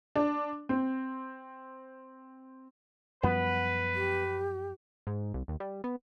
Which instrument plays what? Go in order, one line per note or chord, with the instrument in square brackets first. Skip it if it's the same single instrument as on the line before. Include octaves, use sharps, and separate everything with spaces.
[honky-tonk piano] D4
C4
[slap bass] F#2 F3 G3 [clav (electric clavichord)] B3 [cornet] B4
[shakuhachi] G4
[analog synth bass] G#2
C2
D#2
G3
B3